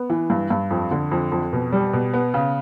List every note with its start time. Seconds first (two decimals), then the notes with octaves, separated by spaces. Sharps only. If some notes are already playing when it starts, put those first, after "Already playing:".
Already playing: B3
0.10 E3
0.30 G2
0.50 G2
0.71 F2
0.91 D3
1.12 F2
1.32 F2
1.53 B2
1.72 G3
1.93 B2
2.13 B3
2.34 C#3